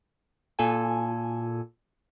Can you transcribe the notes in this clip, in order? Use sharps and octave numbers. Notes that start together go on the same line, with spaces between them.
A#2 A4 G#5